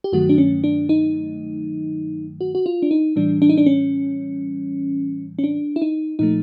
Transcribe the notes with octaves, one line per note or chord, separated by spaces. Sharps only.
G4
G2 D#3 F#3 A3 F#4
D4
C#4
D4
D#4
F#4
F#4
F4
D4
D#4
A2 E3 G3 D4
D4
D#4
D4
C#4
C#4
D4
E4
D#4
A#2 F3 A3 D#4